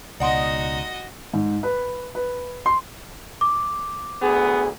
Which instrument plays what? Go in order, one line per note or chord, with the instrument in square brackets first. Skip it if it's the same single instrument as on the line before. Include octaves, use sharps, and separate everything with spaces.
[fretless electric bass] C#2 B2 [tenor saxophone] D#4 [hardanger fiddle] F#4 D#5 [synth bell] D5 F#5 C6
[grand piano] G#2
B4
B4
C6
[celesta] D6
[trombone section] D2 B3 G#4